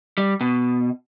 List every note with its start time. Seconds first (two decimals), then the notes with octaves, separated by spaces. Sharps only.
0.18 G3
0.41 B2